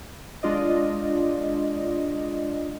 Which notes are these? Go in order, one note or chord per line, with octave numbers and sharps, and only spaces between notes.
G#3 D4 F4 D5 D#5